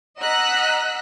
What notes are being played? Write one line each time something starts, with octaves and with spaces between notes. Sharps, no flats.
D#5 F#5 A#5 E6 F#6 B6